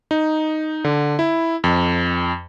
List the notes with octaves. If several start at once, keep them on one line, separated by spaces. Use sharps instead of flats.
D#4
D3
E4
F2